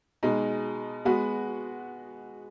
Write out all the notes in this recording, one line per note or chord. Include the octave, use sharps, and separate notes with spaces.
B2 G#3 D#4
G#3 B3 F#4